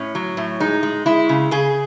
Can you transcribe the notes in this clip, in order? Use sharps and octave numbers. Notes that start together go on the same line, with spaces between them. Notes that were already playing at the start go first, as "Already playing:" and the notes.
Already playing: A2 C#4
F#3
A2
G#3 D#4
G#3
G#3 E4
C#3
C#3 G#4